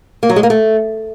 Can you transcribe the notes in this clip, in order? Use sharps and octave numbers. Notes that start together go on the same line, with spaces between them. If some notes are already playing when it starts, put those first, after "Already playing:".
A#3
F#3
G#3
A#3
A3